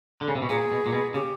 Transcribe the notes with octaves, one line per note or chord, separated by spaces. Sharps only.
D3
C#3
C3
B2
A#2 G#4
B2
A#2
B2
C#3 G4